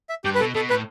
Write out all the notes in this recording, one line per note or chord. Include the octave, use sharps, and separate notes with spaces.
E5
G2 G4
B4
B2 A4
B2 A4
A2 B4